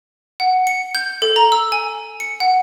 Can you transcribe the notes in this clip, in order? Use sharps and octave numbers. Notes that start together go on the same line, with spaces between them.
F#5
C#7
G6
A4
A#5
E6
G#5
C#7
F#5